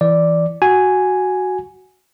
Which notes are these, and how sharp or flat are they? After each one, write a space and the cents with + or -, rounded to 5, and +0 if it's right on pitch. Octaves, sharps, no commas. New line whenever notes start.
E3 +0 D5 +0
F#4 +0 G#5 +0